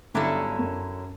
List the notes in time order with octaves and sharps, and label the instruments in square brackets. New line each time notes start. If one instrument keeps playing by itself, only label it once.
[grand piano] G1 G2 [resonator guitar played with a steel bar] D3 F#3 C#4 E4 A4
[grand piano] F#2